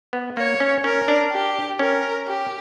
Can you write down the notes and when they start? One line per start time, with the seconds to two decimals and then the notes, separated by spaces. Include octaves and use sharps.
0.13 B3
0.37 A#3 C#5
0.60 C#4
0.84 C#4 A#4
1.08 D4
1.32 G4
1.79 C#4 A#4
2.28 G4